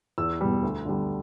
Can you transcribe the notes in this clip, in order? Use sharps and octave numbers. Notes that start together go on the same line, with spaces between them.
E2 E6
B2 G3
D2
D3 G3